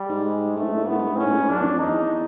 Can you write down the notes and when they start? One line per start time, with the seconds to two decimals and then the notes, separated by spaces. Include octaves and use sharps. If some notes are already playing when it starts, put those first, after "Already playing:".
Already playing: G3
0.09 G#2
0.25 G#3
0.56 G#2 A3
0.63 A2
0.70 G#2
0.77 A2
0.84 G#2
0.87 A2 B3
0.98 G#2
1.05 A2
1.12 G#2
1.18 A2 C#4
1.26 G#2
1.34 A2
1.41 G#2
1.49 F#2 D4
1.61 E2
1.65 F2
1.80 E2 D#4